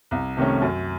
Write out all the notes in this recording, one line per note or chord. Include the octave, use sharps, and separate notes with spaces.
C2
C3 D#3 A3 C#4
F#2